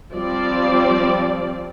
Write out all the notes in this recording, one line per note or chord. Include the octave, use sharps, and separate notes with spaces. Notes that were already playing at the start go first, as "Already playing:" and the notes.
F3 G3 C4 D5